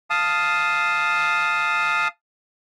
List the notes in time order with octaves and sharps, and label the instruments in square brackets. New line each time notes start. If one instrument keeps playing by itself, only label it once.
[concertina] F5 A5 D#6